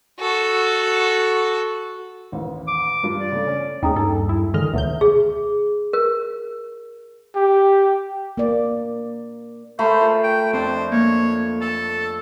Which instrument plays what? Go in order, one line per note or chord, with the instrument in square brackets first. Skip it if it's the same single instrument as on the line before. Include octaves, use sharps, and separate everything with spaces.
[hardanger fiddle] F#4 A4
[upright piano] A1 D#2
[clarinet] D6
[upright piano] G2 F4
[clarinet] D5
[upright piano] C#3 A3
C#4
[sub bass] D#2 [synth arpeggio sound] G#3 C#4 D#4 [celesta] G5 A#5 D#6
[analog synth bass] G2 [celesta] D#4 [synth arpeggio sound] A4
[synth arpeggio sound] E4
[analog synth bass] D3 [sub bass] D#3 [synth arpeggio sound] G#3 D#5 F6
[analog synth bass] D2 [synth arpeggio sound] B2 F#3 G6 [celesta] E5
[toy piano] G#4
A#4
[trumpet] G4
[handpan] A#3 D5
[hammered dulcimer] A3 B5 [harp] A#4 G#5 A#5 [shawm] C5
[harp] F4
[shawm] G5
[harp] F2 D4 D5 [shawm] C5
[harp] A#3 [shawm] C#5
[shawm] A4 [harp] A5